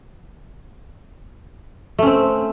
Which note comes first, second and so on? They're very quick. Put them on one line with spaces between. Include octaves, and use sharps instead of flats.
A3 C#4 C4